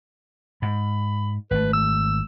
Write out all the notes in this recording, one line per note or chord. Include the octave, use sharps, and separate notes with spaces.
G#2 B5
G#1 A3 B4
E6